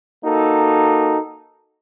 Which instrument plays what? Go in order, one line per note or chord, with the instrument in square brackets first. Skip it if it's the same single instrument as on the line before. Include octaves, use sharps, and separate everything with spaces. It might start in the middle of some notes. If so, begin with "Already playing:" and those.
[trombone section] A#3 D#4 F#4 A4